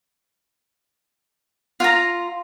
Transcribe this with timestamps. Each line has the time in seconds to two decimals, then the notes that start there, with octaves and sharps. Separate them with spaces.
1.80 F4 A#5